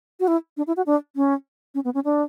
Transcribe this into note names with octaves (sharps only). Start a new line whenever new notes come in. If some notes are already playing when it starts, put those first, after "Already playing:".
F#4
E4
D4
E4
F#4
D4
C#4
C#4
B3
C#4
D4